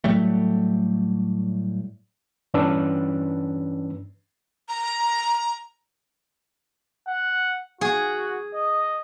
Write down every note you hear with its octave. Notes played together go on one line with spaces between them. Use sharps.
A2 F#3 G3 A3
G2 E3 C#4 D4 B4 E6
A#5
F#5
F#4 G#4
D#5